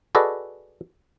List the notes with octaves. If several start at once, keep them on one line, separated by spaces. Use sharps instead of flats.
F#4 G#4 A4 B4 D5 D#5